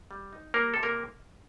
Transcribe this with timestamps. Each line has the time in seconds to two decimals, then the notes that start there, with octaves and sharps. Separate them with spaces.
0.11 G3
0.33 D#4
0.54 G3 A#3 A#4
0.74 C3 A4
0.83 A#3 A#4